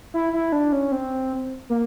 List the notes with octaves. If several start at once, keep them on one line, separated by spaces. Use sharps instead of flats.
E4
E4
D4
C#4
C4
A#3